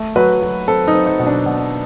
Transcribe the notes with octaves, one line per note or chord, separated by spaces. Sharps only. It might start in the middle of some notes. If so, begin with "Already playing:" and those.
Already playing: A3
F#3 B4
F#3
C4 A4
D#4
C4
D#4
B2
D4
B2